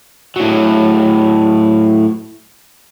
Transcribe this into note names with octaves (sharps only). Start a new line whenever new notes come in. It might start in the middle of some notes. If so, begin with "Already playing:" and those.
A2 F#3